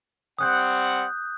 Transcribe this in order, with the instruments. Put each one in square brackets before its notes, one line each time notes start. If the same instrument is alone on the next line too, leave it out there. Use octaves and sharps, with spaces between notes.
[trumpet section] G3 C4 F#5 [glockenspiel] D#6 F#6 G6